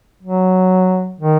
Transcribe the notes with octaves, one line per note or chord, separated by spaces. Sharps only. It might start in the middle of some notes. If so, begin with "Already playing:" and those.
F#3
D#3